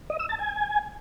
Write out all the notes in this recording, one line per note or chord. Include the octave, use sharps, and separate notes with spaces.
D#5
E6
A5
G#5